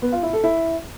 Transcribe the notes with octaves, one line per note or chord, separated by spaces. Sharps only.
B3
F4
E4
A4
E4